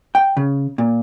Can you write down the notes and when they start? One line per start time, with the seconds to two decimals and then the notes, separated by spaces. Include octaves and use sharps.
0.15 G5
0.37 C#3
0.78 A#2